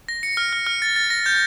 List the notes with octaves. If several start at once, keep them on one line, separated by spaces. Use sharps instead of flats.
A#6
C#7
F6
F6
F6
A6
A6
A#6
G6